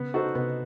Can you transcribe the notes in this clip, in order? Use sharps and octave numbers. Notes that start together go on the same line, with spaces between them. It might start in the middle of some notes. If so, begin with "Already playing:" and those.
Already playing: C#3 B3
D#4 F#4 A4 C5
C3 B3